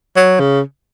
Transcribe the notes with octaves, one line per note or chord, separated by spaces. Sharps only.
F#3
C#3